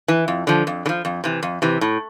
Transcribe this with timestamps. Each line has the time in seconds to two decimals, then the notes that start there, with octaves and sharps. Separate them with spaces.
0.08 E3
0.28 F2
0.47 D3 F3
0.67 F2
0.86 D3
0.89 F3
1.05 F2
1.24 C3 E3
1.43 F2
1.62 C3 E3
1.81 A2